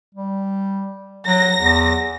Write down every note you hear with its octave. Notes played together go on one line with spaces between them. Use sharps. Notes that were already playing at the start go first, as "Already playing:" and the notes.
G3
F#3 A#6
E2